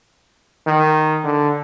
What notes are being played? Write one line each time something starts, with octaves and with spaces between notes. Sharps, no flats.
D#3
D3